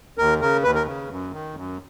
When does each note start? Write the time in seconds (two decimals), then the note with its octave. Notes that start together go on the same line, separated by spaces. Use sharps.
0.18 D#2 A#4
0.40 C#3 A#4
0.63 D#2 B4
0.75 A#4
0.86 C#3
1.09 F#2
1.32 D#3
1.55 F#2